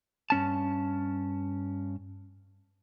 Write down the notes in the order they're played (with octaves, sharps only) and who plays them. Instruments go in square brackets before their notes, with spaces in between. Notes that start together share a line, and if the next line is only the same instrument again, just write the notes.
[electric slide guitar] G2 C#4 A5